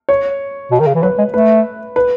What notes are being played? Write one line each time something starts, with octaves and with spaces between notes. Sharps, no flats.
C#5
B2
D#3
C#3
E3
F#3 B4
G#3
A3 B4
B4